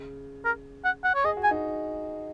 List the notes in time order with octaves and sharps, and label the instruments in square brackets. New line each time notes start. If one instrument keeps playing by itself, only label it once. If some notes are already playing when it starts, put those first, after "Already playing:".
Already playing: [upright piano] C#3
[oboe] A#4
F#5
F#5
C#5
[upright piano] G#4 [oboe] D#5
[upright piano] F#4
[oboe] G#5
[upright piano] D#4